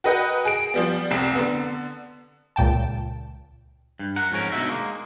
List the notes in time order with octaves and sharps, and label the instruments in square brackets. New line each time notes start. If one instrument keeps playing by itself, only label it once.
[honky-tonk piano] F#4 A#4 B4 D#5 F#5 G5
G#4 D7
F3 G3 B3
F1 C2 C4 C7
D3 B3
[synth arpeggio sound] C#2 A#2 G5 A5
[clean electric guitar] G2
A#4 F#5
F2 G#2 C#4 A#4
D2 G#2 B2 D#4 F#4 E5
G#3 A#3